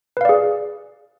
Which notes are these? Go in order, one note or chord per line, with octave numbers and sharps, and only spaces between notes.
G#4 B4 D5 F5